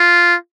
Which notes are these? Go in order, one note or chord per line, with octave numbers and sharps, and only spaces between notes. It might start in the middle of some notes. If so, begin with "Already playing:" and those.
Already playing: F4